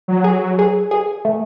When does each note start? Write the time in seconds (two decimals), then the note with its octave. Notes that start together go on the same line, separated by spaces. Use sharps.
0.08 F#3
0.24 G#4
0.59 G#4
0.91 G#4
1.25 A3